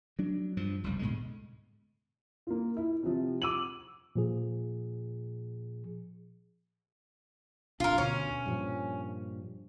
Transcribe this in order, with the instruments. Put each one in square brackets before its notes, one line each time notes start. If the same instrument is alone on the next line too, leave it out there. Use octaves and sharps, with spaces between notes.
[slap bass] F#3 D4
G2 F3
F1 C#2 G3
G#2 B2 D3 G#3
[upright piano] A#3 F4
E4
C3 F3
D6 E6 D#7 F#7
[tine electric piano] A#2 F3 G#4
[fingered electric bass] D1 B1 D4 [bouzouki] F4 A#4
[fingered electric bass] D2 B2 D3 [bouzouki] C#4
[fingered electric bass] G2 A#2 F3